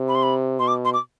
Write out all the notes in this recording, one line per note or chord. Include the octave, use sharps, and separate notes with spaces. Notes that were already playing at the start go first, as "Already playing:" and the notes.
Already playing: C3
B5
C6
B5
B2 C6
D6
C6
D6